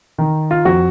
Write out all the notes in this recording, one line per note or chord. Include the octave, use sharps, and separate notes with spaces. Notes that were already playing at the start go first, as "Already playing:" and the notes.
D#3
F4
F2 F#4